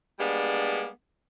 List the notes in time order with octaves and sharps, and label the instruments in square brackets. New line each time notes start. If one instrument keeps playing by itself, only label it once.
[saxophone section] G3 G#3 A#3 B3 D4